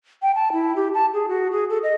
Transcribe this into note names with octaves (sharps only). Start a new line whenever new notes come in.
G5
A5
E4
G4
A5
G#4
F#4
G#4
A4
D#5